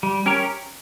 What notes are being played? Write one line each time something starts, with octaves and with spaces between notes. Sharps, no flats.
G3
C#4 G4 A#4 C#5